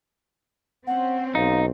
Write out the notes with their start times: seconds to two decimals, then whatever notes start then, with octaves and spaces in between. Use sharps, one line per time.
0.87 C4 C#4 F#5
1.35 B1 D#4 F5